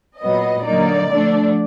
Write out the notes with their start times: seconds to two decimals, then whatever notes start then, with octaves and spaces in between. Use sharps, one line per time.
0.20 A#2 F#3 B3 D#5
0.65 D3 F#3 A#3 D#4 D5
1.10 D3 F3 A3 D4